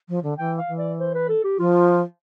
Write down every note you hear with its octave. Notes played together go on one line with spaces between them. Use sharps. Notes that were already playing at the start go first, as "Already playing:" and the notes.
F3
D3
E3 G5
F5
E3
D5
C5
B4
A4
G4
F3 F4